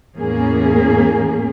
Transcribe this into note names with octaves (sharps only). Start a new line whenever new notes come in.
E2 A2 A#3 C#4 G#4